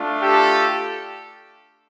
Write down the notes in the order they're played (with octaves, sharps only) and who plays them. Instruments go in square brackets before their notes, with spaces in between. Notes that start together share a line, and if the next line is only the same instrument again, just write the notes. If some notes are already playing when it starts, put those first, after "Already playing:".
Already playing: [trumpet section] A3 D4 F4
G4 A4